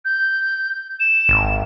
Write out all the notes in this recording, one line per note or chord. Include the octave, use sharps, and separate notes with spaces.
G6
E7
G#1